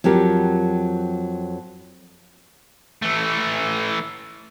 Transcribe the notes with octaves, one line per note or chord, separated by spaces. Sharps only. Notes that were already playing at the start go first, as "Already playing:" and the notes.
F2 F#3 G4 A#4
E3 A3